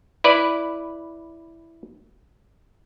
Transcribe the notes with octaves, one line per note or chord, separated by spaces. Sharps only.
E4 B4 D5